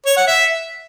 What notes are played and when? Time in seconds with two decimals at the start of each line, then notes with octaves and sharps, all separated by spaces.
0.06 C#5
0.17 F#5
0.27 E5